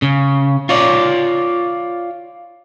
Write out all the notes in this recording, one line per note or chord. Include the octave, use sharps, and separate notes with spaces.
C#3
F4 C#5 D5